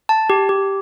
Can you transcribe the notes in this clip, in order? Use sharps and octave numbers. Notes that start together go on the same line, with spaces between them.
A5
G4
G4